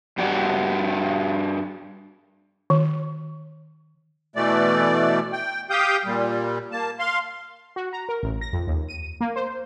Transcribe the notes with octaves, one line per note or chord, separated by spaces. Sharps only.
G2 G3 F#4 D5
D#3
B2 E3 A3 D5
G5
G4 F5 G5 D#6 G6
A#2 G3
A#3 A5
F5 C6
F#4
A#5
A#4
A1
A#6
F2
D#2
D#7
A#3
C5